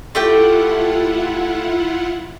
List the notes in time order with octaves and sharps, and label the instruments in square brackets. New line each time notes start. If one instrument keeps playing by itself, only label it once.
[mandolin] A3 G4 G5 [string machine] E4 F4 F#5